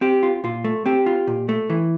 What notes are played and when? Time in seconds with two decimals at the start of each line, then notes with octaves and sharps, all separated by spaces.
0.01 C4 G4
0.23 F4
0.44 A#2 F4
0.64 A3
0.86 C4 G4
1.06 F4
1.27 A#2
1.49 A3
1.70 E3